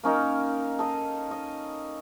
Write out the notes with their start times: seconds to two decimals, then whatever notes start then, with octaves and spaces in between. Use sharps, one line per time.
0.04 A#3 C#4 D#4 A#4
0.79 A4 D#5 F5
1.31 D#5